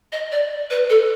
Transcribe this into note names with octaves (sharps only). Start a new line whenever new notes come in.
D#5
D5
B4
A4